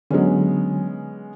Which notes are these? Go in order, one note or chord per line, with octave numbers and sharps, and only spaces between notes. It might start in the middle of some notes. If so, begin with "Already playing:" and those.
D3 F#3 G#3 B3 C#4